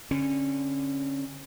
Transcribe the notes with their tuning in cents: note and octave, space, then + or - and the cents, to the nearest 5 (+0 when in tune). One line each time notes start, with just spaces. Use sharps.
D3 -15 C#4 -20